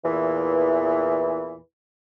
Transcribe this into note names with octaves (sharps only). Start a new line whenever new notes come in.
E2 A#2 E3